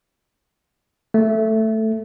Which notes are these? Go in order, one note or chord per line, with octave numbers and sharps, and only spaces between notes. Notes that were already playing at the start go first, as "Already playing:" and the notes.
A3